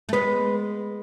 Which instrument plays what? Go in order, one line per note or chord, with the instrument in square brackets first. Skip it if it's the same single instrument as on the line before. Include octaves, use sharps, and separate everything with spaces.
[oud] A3
[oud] G#3 B3 [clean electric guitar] B4